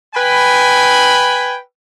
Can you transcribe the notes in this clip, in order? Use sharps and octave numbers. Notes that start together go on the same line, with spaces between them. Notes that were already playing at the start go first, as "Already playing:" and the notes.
B4 G5 G#5 B5